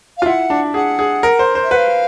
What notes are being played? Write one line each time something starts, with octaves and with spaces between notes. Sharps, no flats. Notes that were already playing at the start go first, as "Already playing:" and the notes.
F5
F4
E4 F#5
D4
G#4 F#5
G#4
A#4
C5
C5
E5
B4 F5 F#5